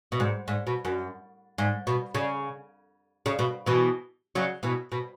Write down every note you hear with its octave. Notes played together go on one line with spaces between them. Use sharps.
B2
G#2
G#2
B2
F#2
G#2
B2
C#3
C#3
B2
B2 E3
C#3 F#3
B2 E3
B2